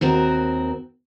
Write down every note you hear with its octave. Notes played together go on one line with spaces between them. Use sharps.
D#2 C4 F#4 A#4